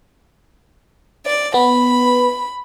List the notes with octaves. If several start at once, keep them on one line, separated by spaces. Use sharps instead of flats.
D5
B3 B5